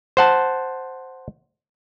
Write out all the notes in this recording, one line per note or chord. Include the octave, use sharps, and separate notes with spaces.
C5 F#5 A5